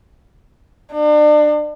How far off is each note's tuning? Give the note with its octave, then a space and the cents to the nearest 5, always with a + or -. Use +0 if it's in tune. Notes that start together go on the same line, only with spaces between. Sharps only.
D4 +35